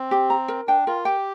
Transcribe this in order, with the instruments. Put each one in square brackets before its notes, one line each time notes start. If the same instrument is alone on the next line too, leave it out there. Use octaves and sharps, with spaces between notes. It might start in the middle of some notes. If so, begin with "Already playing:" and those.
Already playing: [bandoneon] C4
[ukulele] G4
A#5
A#4
[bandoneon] D4 [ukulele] G5
[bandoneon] F4 [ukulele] A#4
[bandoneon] G4 [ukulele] G5